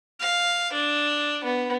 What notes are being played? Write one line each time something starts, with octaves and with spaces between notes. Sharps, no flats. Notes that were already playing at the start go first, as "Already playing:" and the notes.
F5
D4
B3